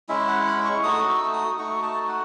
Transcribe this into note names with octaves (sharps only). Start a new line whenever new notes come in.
G#3 C#4 E4 E5
F#5
B5
C#6
A3 D#4 F#4 D#6
E6
D#6
A3 D#4 F#4 C#6
A5
F#5